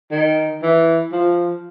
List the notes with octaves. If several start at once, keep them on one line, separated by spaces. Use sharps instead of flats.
D#3
E3
F3